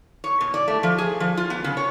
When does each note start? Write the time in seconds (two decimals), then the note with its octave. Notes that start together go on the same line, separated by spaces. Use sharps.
0.24 C#5
0.41 B2
0.54 D5
0.68 A3
0.83 F3
0.98 G#4
1.20 F3
1.37 F4
1.50 B3
1.64 C#3
1.77 C#5